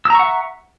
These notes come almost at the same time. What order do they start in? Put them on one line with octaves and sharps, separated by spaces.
E6 A#5 C#6 F#5 E5